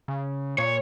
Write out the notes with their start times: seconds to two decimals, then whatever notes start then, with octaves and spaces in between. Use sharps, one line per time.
0.08 C#3
0.58 A#2 C#5